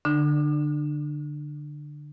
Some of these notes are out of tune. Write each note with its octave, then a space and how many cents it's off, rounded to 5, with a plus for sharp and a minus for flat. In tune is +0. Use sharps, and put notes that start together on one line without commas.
D3 +0 D4 +35